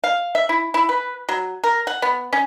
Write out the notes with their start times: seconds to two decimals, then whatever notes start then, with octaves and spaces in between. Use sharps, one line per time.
0.04 F5
0.35 E5
0.49 E4
0.74 E4
0.89 B4
1.29 F#3
1.64 A#4
1.87 F#5
2.02 B3
2.33 C#4